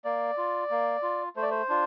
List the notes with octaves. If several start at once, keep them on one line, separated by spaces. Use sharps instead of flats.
A#3 D5
F4
A#3
F4
A3 C5
D5
C5
D4 F4